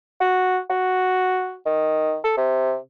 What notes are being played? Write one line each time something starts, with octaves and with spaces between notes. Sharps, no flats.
F#4
F#4
D#3
A4
C3